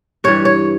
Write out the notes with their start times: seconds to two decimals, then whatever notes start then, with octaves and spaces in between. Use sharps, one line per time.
0.24 G2 E3 G3 C#5
0.45 C#5